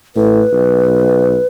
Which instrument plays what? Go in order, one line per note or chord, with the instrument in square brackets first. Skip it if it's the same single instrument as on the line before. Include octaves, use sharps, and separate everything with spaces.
[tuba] A2 [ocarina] B4
[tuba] B1